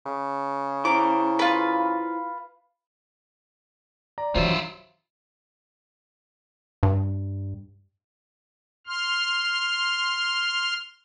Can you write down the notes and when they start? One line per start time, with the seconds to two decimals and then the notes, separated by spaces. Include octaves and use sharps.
0.06 C#3
0.85 E4 C5 A#5 D6
1.39 F4 B4
4.18 D5 A#5
4.35 G2 E3 F#3 F4 C5 E5
6.83 G2
8.87 C6 F6